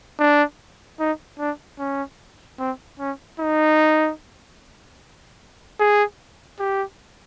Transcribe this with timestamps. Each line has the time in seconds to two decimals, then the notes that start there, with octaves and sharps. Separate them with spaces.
0.20 D4
1.00 D#4
1.39 D4
1.79 C#4
2.59 C4
2.99 C#4
3.40 D#4
5.80 G#4
6.59 G4